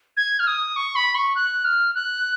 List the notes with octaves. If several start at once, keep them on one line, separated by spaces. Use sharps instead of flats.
G#6
F6
D#6
C#6
B5
C#6
F#6
F6
F#6